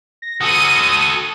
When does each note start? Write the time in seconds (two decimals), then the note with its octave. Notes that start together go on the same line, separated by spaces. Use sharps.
0.22 A#6
0.41 F#4 A4 D#6 C#7 D#7